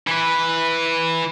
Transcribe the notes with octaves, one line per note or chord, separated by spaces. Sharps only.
E3 B4